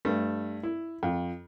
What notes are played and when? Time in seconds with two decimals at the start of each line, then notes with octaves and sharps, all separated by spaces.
0.05 G2 A3
0.63 E4
1.03 F2